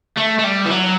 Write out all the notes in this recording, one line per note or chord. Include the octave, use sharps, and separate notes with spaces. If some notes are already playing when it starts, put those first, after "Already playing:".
A3
A3
G3
E3
F#3